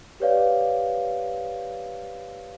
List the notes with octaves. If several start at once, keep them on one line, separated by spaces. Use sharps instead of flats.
G4 B4 C#5 D5 F5